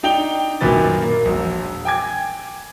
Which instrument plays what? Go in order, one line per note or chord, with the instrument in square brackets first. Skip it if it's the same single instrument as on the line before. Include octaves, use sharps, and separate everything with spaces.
[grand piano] D4 D#4 G5 F7 G7
B1 F#2 A#2 D#3 B4 A6
A#3
E1 A#1
G5 G#5 D6 G#6